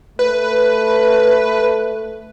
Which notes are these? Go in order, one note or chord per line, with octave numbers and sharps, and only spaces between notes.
A3 B4